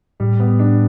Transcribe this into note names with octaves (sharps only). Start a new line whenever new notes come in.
A2 G3
B3
D4